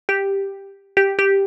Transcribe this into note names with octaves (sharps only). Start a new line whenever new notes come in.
G4
G4
G4